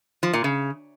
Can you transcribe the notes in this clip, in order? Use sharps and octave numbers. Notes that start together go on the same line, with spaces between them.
F3
A#2
C#3